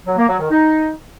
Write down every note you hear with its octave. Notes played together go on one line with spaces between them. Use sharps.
F#3
A#3
F#3
D#3
D#4